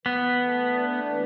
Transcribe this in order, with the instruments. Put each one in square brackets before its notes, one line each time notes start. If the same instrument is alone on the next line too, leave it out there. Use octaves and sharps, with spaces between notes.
[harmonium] E3 [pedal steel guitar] B3
[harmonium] A3
D4
E3